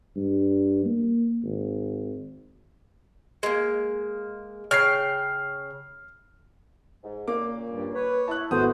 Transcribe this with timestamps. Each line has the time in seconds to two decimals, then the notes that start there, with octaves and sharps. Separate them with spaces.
0.16 G2
0.85 A#3
1.43 G#1
3.43 G#3 A#3
4.71 C#3 G5 F6 C7
7.03 G#2
7.28 A#2 C#3 A#3 D6
7.69 G2
7.94 B4 C#5
8.28 E4 A5 F#6
8.51 G#1 E2 B3 F#4 A4 C5 D#6